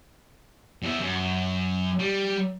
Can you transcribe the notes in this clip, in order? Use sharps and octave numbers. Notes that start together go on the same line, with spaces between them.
E2 E5
F#2
G3